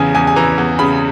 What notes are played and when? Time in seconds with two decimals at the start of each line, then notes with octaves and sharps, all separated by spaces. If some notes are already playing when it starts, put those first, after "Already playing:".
Already playing: E2 C#3 E3 G#5
0.15 E2 G#5
0.27 G#5
0.36 E3 A#5
0.58 E2
0.79 C#3 B5